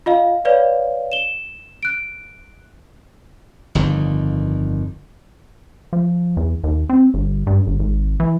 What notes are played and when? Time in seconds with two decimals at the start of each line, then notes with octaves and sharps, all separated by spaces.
0.06 F4 D#5 F5
0.45 B4 C#5 D5 F5
1.12 E7 G7
1.83 F#6 D7
3.75 G1 F2 D3 D#3
5.93 F3
6.37 E2
6.64 D#2
6.89 C4
7.14 G1
7.47 G2
7.67 G1
7.79 G#1
8.20 E3